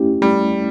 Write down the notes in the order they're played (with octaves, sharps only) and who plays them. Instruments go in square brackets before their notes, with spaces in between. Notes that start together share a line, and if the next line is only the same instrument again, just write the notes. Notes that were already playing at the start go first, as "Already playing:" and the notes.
Already playing: [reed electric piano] A3 C#4 E4 G4
[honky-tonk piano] G3 [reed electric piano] A3